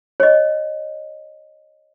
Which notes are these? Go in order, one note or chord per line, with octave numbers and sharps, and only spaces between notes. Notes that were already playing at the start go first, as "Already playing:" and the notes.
C#5 D#5